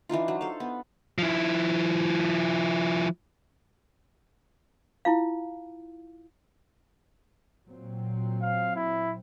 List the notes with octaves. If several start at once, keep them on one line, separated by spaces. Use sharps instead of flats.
E3 D4 D#4 F4
F#3
A4 C5 F5
B3
F3 E4
E4 F4 F5
A#2 F#3 C4
F5
E4